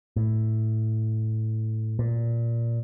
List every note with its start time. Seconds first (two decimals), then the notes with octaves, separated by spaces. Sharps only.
0.16 A2
1.99 A#2